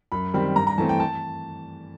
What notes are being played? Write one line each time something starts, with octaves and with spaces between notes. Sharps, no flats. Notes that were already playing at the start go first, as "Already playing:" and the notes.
F#2 B5
D#3 G3 C4 B5
G2 A#5
A#5
E3 A3 C4 A5
G5
A5